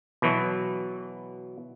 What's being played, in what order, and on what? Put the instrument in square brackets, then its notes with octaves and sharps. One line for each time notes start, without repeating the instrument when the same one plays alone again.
[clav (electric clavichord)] B2 E3 F#3